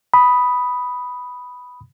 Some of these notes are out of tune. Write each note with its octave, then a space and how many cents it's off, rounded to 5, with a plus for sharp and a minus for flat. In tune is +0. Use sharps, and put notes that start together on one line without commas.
B5 +0 D#6 +0